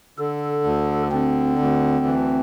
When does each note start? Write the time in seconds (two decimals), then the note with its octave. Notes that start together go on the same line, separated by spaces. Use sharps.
0.18 D3 A4
0.64 D2
1.11 D3 C4
1.59 D2
2.05 E3